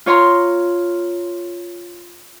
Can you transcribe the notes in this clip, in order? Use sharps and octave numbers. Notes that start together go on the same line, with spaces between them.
F4 C#5 A#5 C6